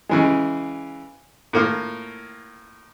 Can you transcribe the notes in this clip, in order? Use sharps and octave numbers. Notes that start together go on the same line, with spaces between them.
C#3 E3 G#3
A2 A#3 F4